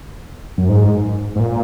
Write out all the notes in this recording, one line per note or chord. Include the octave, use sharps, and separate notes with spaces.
F#2
G#2
G#2
A#2